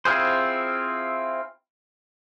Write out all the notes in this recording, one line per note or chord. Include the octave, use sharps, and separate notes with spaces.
C4 E4 F4 G#4 C5